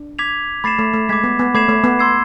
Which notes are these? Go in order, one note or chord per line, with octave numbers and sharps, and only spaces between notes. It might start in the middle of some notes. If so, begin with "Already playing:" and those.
Already playing: D4
D6 G#6 B6 F7
A3 B5 D6 A6 C7 E7
A3
A3
G#3 D6 G#6 B6
B3
B3
A3 B5 D6 G#6 C7 E7
A3
B3
C6 E6 G#6 C7